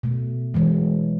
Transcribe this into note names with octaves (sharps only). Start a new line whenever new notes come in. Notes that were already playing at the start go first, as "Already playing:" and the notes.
B2 A3
E3 F#3 G#3